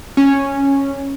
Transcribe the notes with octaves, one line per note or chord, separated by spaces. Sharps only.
C#4